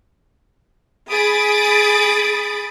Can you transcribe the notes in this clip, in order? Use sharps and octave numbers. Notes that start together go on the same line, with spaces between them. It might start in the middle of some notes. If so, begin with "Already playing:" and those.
G#4 B5 D#6 A6 D7